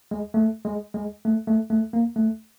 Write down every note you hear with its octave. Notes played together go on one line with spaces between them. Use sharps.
G#3
A3
G#3
G#3
A3
A3
A3
A#3
A3